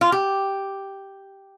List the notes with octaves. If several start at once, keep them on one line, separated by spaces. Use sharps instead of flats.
F4
G4